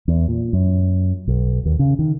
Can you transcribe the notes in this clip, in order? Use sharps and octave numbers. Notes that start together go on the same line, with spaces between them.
E2
A#2
F#2
B1
D#2
C#3
D#3